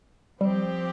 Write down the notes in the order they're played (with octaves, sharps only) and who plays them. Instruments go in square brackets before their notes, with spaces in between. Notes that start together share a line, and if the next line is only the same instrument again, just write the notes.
[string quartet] F3 C4 G4 [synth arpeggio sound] G3